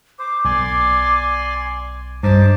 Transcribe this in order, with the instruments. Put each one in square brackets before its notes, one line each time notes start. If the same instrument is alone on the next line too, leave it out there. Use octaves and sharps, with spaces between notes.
[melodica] C5 [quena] D6
[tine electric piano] B1 [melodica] D5 G#5 C6
[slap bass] G2 [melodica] D#4 A5 D6 [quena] C5